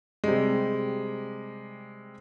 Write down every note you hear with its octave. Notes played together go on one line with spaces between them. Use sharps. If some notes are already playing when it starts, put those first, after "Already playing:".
C3 G3 G#3